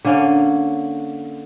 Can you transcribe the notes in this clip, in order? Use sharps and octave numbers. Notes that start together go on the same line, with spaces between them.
D3 A#3 C#4